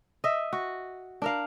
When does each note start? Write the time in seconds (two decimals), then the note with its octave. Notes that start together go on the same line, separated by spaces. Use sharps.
0.24 D#5 E5
0.53 F#4
1.22 D4 A#4 F5